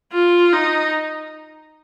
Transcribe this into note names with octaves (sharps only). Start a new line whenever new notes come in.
F4
D#4